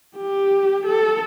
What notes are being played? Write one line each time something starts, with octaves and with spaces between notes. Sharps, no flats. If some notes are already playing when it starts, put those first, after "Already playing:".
G4
A4